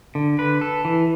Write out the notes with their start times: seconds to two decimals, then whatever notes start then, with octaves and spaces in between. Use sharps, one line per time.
0.15 D3
0.39 B4
0.61 A4
0.85 E3